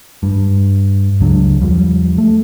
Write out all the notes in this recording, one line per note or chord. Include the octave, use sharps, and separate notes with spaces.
G2
C#2 C#3 F#3 D4
E2 F3 G3
A3